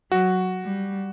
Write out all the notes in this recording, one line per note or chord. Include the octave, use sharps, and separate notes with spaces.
F#3 F#4
G3